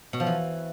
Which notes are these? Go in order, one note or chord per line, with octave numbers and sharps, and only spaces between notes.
B2
F3
E3